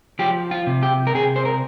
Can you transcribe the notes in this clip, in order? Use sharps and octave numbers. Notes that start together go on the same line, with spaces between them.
F3 G4
F4
C3
G4
A#4
C3 G#4
C5
A#4